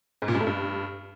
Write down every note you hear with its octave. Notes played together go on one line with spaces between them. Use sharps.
G#2
A#2
G2
A3
G2